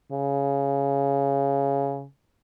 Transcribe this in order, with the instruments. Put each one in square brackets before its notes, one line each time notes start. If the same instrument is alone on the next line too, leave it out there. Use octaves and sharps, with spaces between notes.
[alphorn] C#3